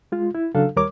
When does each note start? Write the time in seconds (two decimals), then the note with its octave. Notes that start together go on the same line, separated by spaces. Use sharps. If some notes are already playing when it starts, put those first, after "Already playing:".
0.12 G#3 F4
0.35 E4
0.55 C#3 F#3 D4 A4 F5
0.76 D#2 G3 A#4 C#5 D6